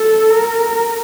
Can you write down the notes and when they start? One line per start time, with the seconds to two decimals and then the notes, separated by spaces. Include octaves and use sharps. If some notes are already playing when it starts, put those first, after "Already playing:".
Already playing: A4
0.30 A#4